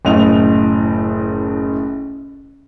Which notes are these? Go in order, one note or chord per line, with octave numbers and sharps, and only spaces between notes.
F#1 A2 A3 D#5 F7